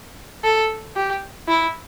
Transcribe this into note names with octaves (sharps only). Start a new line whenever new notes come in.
A4
G4
E4